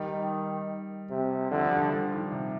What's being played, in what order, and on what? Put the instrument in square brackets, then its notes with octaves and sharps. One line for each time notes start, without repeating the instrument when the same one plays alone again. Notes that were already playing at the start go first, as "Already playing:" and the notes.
Already playing: [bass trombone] D#3 [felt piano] G3
[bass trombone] C3
[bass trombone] D3 [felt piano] F3
[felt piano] F3
G3
F3
D#3
C3